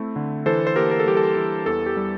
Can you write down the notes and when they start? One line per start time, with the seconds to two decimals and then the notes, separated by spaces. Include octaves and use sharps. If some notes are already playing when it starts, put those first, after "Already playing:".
Already playing: A3 C4 E4
0.16 D3
0.46 E3 A4 C5
0.67 C5
0.76 A#3 G4 A#4
0.91 A#4
1.00 A4
1.06 G3 G4
1.17 A4
1.37 E3
1.66 E2 A4
1.86 G4
1.97 G3